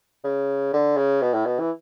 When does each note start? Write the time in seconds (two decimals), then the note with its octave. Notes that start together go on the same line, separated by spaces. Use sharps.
0.24 C#3
0.73 D3
0.97 C#3
1.22 B2
1.34 A2
1.46 B2
1.60 E3